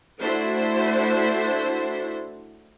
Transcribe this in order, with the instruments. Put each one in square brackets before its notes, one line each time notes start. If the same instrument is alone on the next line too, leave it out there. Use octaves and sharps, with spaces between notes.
[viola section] A3 D4 E4 F#4 C5